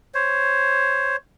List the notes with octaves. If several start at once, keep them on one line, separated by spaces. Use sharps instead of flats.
C5 C#5